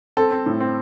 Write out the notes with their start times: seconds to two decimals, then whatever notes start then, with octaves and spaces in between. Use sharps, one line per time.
0.17 C4 A4
0.31 C4
0.46 A2
0.60 C4